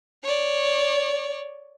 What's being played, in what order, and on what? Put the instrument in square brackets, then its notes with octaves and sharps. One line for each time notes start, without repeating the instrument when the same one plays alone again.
[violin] C#5 D5